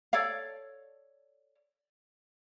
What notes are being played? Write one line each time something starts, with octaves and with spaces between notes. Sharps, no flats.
A4 C#5 D5 F5